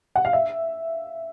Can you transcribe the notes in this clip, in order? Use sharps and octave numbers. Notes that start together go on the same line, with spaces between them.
F#5
F5
E5